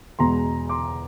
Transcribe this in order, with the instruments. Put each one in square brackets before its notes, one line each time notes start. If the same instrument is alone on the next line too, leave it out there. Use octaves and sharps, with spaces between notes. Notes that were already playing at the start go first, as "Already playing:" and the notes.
[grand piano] E2 B2 G#3 A#5 C6
C6 D6